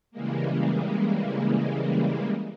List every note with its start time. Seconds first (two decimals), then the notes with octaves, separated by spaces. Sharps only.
0.11 C#3 E3 G3 G#3 A#3